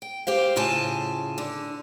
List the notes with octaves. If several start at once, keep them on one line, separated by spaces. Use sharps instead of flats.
G5
G4 C5 F5
A2 C#3 F4 G#5 A5
D3